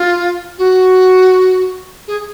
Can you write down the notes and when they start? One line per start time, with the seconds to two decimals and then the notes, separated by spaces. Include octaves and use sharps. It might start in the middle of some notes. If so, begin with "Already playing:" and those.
Already playing: F4
0.58 F#4
2.08 G#4